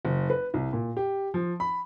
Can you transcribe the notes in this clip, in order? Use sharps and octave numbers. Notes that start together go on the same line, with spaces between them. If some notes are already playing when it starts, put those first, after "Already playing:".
F#1
B4
C2
A#2
G4
F3
B5